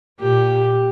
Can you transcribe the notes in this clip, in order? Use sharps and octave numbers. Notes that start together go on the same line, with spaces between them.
A#2 G4